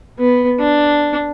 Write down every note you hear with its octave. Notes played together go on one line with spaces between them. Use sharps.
B3
D4